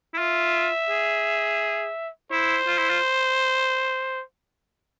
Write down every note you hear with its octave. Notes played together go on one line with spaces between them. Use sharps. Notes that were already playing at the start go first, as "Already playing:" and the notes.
E4
F4 E5
G#4
E4 C5
F4
E4
F4